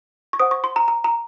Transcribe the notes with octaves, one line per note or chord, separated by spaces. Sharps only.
C#6
C5 F#5 D#6
C#6
C6
A#5
A#5
A#5